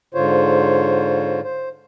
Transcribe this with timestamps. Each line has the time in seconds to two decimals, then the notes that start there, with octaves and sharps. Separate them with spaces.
0.14 G#2 D3 F4 C5 C#5
1.44 C5